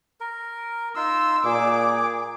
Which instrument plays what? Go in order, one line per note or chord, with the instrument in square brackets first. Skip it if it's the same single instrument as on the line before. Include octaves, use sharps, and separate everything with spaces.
[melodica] A#4
[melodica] D#4 F4 C6 [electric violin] E6
[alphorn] A#2 [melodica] G#4 [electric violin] D6